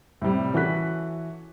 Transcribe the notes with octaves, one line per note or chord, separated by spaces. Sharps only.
A2 C3 G3
E3 C#4 F#4 A4 F#6 B6